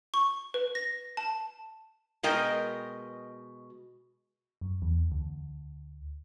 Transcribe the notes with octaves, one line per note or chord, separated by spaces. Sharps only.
C#6
B4
A#6
A5
B2 G#3 A#4 D#5 G5
F#2
E2
D2